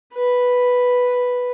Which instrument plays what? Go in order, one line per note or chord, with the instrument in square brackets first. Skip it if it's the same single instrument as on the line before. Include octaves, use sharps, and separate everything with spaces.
[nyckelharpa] B4